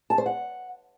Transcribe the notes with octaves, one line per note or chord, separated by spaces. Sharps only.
A5
C5
F#5